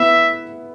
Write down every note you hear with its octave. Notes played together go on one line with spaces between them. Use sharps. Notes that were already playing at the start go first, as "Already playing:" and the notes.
Already playing: B3 E4 B4 E5